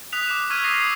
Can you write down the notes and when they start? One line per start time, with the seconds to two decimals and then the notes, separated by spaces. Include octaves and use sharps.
0.13 D#6 F#6 B6 F7
0.27 D6 F#6 E7
0.50 C#6 E6 F6 G#6 D#7
0.64 D#6 E6 A#6 C7 D#7
0.78 D#6 E6